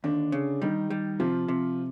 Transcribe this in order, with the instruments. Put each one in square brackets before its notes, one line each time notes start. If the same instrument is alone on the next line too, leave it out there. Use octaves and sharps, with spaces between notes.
[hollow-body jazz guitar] D#2 [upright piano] D3 D4
[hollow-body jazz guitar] C#3
[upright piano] D#3 D#4 [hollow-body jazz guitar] G3
[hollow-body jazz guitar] G3
[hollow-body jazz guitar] C3 [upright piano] F3 F4
[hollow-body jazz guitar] C3